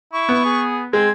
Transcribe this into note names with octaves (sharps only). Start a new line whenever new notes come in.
E4 C#6
B3
G#4
G#3 C4 G#6